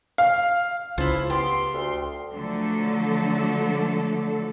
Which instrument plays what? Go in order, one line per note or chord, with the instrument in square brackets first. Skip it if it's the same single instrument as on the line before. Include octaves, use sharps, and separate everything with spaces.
[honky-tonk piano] F5
[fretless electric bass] C#2 [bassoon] F3 [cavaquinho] E4 F4
[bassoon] B3 [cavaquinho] G4 [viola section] C6
[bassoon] D2
[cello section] D3 F3 F#3 A3 A4